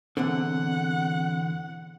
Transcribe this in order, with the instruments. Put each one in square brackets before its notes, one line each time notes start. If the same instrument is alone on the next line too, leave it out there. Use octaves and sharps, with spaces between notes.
[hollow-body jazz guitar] E2 B2 D3 [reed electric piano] C4 [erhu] F#5